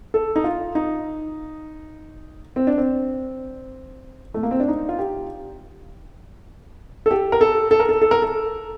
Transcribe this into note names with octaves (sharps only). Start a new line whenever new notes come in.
A4
D#4
F4
D#4
C4
D4
C4
A3
A#3
C4
D4
D#4
F4
G4
A4
G4
A#4
A4
A4
A#4
A4
A4
A#4
A4